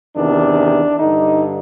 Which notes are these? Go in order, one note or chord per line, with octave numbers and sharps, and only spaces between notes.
E2 C3 D#3 D4
G2 D3 D#4